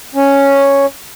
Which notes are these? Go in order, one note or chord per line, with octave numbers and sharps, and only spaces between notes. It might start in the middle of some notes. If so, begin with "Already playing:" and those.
C#4